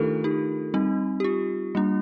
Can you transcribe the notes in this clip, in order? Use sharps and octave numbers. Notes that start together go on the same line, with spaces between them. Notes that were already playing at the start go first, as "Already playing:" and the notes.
Already playing: D#3 A3 D4 D#4 F4 G4 A4 A#4
D#4 G4
G3 C4 D#4
G4
F4
G3 A#3 D4